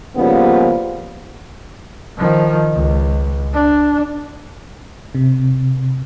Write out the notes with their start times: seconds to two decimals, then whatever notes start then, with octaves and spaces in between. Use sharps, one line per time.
0.17 C#3 F3 G3 A#3 B3 C#4
2.17 D#3 F3
2.73 C#2
3.53 D4
5.15 C3